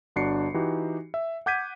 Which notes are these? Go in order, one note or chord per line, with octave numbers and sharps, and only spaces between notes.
G1 D4 F#4 C7 C#7
E3 D#4 F#4 G4
E5
F#5 D6 G6 G#6 B6 D#7